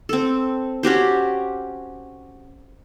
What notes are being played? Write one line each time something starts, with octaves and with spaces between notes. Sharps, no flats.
C4 A4
C#4 F#4 G4 C5